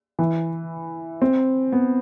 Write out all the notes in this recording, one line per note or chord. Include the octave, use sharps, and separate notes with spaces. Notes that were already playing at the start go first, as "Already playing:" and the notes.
E3
C4
B3